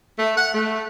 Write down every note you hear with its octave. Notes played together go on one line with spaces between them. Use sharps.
A3
F#5
A3